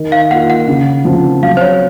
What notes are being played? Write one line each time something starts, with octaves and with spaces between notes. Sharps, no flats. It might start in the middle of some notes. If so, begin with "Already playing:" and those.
Already playing: D#3
F5
A#3 F4 F#5
F#5
C#3
F3 C4
F#3 F5
C5
C#5